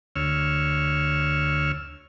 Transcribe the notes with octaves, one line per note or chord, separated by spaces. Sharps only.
D2 C#5 E6 F6